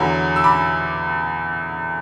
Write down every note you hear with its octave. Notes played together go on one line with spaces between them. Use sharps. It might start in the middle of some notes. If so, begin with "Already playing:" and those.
Already playing: E2 D3 F#3 B5
E6
B5 D6